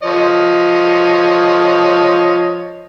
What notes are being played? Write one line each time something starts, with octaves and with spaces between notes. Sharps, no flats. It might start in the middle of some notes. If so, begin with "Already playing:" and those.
F3 C#5 D#5